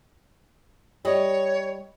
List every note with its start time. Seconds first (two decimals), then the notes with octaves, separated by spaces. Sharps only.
1.05 G3 G4 C#5 D#5